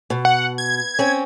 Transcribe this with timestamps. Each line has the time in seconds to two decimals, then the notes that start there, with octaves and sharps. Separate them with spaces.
0.10 B2
0.25 F#5
0.58 G#6
0.99 C4 C#4